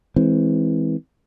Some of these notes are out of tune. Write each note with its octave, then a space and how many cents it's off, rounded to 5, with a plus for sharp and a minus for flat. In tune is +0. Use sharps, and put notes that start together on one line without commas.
E3 -25 G#3 +0 C4 +0